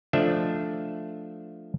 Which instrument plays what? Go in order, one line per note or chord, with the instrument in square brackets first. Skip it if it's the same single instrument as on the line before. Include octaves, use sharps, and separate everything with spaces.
[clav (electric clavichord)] F3 A3 D4 D#5 E5